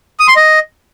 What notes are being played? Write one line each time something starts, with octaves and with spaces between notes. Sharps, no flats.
D#6
C6
D#5